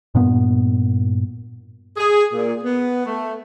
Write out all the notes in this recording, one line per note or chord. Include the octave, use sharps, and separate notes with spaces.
G2 A#2 B3
G#4
A#2
B3
A3